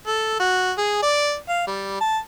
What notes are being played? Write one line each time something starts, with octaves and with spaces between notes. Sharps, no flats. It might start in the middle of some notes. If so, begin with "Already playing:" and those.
A4
F#4
G#4
D5
F5
G3
A5